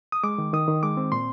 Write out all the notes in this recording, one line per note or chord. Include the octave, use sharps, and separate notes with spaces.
D#6
G#3 D6
D#3
D#3 D#6
D#3
G#3 D6
C4
A#2 C6